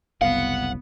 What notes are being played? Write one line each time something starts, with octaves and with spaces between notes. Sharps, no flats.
F#1 C2 B3 F5 F#5